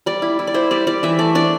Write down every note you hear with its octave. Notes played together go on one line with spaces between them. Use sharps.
G3 D5
E4
E4
D5
E4 C5
G3 D5
G3 D5
E3 E5
A3 D5
D4 D5